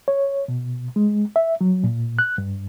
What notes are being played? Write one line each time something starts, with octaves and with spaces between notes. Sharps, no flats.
C#5
B2
G#3
E5
F#3
A#2
F#6
G2